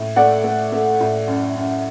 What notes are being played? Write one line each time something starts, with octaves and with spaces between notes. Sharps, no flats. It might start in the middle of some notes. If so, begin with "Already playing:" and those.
Already playing: A2
A3 D5 F#5
A3
A3
A2
F#2
F#2